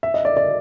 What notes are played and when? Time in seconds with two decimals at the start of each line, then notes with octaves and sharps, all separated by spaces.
0.03 E5
0.14 D#5
0.25 D5
0.37 D5